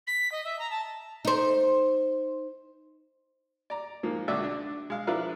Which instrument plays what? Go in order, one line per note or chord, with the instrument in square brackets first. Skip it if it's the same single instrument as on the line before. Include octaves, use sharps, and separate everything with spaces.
[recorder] B6
D#5
E5
A#5
A5
[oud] D#4 C5
[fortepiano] D5 A#5
G#2 F3 A#3
C#2 D3 D4 F#4 D5 E5
D4
G#3 F5
F3 D4 E4 A#4 B4 F5